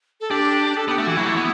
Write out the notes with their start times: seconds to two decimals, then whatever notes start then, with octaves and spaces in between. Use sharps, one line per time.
0.21 A4
0.30 D4 G4
0.77 A4
0.88 B3 G4
0.98 A3
1.02 E3 F#4
1.17 F#3 E4
1.26 A3
1.37 B3